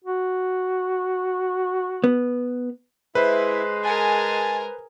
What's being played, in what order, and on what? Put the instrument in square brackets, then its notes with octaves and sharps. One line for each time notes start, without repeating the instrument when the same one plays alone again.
[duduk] F#4
[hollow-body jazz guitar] B3
[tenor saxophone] G#3 [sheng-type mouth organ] E4 E5 [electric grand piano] B4 C5
[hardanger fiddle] G#4 A#4 [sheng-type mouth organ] G#5 A5